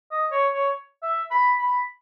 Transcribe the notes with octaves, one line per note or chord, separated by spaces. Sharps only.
D#5
C#5
C#5
E5
B5
B5